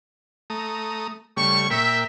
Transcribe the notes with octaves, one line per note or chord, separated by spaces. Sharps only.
A3 A#5 D#6
C#3 G3 A3 C#6
A#2 A#4 E5 G5